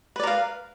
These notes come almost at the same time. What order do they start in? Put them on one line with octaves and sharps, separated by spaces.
B4 D5 A#4 F5